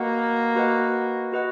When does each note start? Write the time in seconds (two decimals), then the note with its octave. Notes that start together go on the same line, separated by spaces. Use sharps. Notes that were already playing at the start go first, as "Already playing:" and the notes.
Already playing: A#3 F#4 B4 D#5 F#5
0.55 F#4 B4 D#5 F#5
1.32 F#4 B4 D#5 F#5